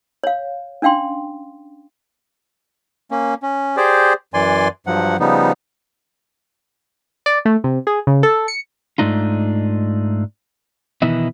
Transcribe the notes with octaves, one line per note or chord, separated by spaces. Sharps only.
C#5 F5
C#4 D4 F5 G5 C6
A#3 C#4
C#4
G4 G#4 C5 D5
F#2 E3 D5 G#5 C6
G2 F3 F#3 F#5
C#3 F3 G3 B3 D#4
D5
A3
C3
G#4
C#3
A4
C#7
G#2 B2 A3 D4 D#4 F4
B2 D#3 E3 B3 D#4 E4